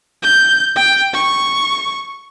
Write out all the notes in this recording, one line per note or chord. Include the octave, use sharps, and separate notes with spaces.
G6
G5
C#6